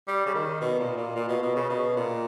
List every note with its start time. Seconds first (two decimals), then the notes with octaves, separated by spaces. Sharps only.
0.08 G3
0.26 C#3
0.34 D#3
0.61 B2
0.79 A#2
0.97 A#2
1.16 A#2
1.28 B2
1.42 B2
1.56 C#3
1.69 B2
1.96 A#2